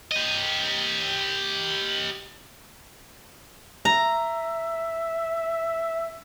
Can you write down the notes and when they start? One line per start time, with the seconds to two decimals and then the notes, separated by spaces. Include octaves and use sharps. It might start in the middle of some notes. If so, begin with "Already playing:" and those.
0.11 G4 D#5
3.85 E5 A#5